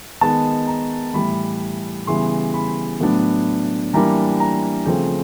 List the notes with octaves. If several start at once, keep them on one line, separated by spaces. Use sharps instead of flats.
D#3 G#3 B3 A5
A#5
A2 E3 G3 B5
C#3 E3 G3 B3 C6
B5
A2 F#3 B3 D4
E3 G3 A#3 D4 A#5
A#5
C#3 F3 A3 C4 G5